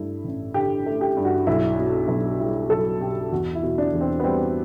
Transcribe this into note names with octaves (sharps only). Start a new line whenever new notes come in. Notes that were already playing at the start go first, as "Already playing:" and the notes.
Already playing: G2 A3 E4
A1
D3 G4
A3
G4
G2
F#4
B1 E4
B2
B1
G3 E4
B1 A4
B2 G4
E2 F#4
E4
B2
D4
E2
C4
B3
G3 C4